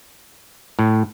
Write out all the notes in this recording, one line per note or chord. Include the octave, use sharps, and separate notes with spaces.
A2